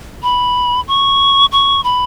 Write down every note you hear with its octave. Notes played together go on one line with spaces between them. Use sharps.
B5
C#6
C#6
B5